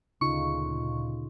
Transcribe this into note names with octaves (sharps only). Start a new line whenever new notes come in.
D2 A#2 C#3 D#4 F4 C#6